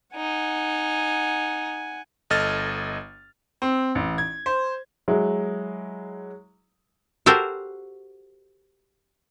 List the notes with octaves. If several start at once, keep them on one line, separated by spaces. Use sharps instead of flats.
D#4 F#5 G#5
G1 A4 D#5 F6 A6
C4
A1
G#6
C5
F#3 G#3 E4
F#4 G4 A4 A#4 C5